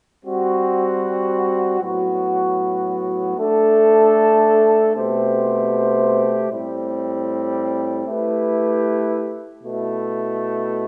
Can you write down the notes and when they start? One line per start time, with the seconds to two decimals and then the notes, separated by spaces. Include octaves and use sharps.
0.24 G3 C4 F#4
1.81 A2 F#3 B3 F#4
3.37 A3 D4 A4
4.93 B2 A3 C4 G4 C5
6.49 A2 G3 C4
8.06 A3 E4 G4 B4
9.62 B2 A3 E4